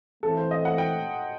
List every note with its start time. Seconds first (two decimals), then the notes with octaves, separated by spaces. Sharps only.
0.23 E3 A3 C4 A4
0.37 C5
0.51 D#5
0.65 F#5
0.78 G5